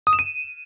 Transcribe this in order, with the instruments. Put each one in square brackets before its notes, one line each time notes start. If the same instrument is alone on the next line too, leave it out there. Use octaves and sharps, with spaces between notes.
[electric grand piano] D#6
E7
D#7